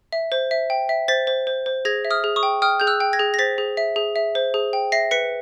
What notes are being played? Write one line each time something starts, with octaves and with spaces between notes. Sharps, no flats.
E5
C5
E5
G5
E5
C5 A6 B6
C5
C5
C5
G#4 G#6 A#6
E5
D#6 F6
G#4
C#6 D#6
G5
G5 D#6 F6
G#4 G6
E6 F#6
G5
G#6 A#6
G#4
A#6
C5 A6 B6
G#4
E5
G#4
E5
C5
G#4
G5
E5 A#6 C7
B4 B6 C#7